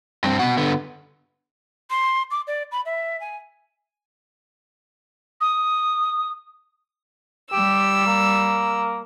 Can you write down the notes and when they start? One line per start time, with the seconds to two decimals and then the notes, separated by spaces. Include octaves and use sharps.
0.24 G2 C4
0.39 B2 F#5
0.58 D3 B3
1.90 C6
2.31 D6
2.47 D5
2.72 B5
2.86 E5
3.21 G#5
5.41 D#6
7.53 G3 G4 E6
8.07 A#3